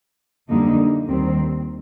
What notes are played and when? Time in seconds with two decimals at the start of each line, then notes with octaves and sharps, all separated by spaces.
0.49 F2 D3 G3 A#3 D#4
1.08 D#2 D#3 G3 C4